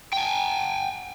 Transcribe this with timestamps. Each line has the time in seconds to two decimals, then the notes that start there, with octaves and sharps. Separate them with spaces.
0.13 G5 G#5